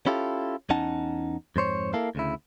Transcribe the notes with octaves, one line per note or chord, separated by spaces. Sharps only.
C#4 E4 F4 G4 A4
E2 C#4 D#4 F#5 A5
F2 G#2 C5 C#5
A#3 E4 A4 F5
D2 C#3 E4